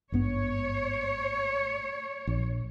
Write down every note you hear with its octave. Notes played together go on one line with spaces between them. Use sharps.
G#1 G2 B3 C#5
A#1